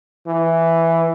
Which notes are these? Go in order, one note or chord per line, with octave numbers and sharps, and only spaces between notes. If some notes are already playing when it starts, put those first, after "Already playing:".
E3